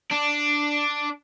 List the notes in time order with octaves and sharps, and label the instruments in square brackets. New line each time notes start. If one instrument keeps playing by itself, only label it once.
[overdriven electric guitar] D4